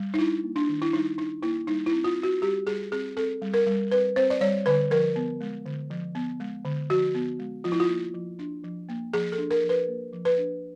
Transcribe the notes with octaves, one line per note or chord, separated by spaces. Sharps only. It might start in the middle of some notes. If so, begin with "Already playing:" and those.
Already playing: G3
D#4
D4 E4
A#3
D4
D#3
E4
G3 D#4
D4 D#4
A#3 E4
G3 D#4
E4
C4
F4
C4
F#4
G3 G4
G3 G#4
C4 G#4
C4 A4
G3
A#4
G3
C4 B4
C4 C5
D5
G3 C#5
D3 B4
F3 A#4
B3
G#3
D3
F3
B3
G#3
D3
F3 F#4
B3
G#3
F3 F4
E4
F4
A#3
F3
D4
F3
A#3
F3 G#4
A4
D4
A#4
F3
B4
A#3
F3
B4
D4